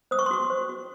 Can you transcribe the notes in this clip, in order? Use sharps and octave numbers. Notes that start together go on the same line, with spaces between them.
C5 D#6
C#6
C6
F#4 C#6
C5
F#4